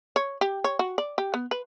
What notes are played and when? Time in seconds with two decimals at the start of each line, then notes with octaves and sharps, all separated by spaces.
0.16 C#5
0.41 G4
0.64 C#5
0.79 F#4
0.98 D5
1.18 G4
1.34 B3
1.51 B4